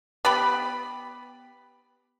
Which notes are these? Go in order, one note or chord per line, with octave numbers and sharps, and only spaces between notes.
B3 G4 B5